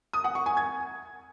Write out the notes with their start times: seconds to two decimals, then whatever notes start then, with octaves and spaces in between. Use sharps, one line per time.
0.13 D#6
0.24 F#5
0.35 C#6
0.46 G#5
0.57 G#6